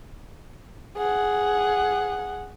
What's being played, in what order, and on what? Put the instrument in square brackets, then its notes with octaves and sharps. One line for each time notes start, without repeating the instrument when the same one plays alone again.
[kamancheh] G#4 F#5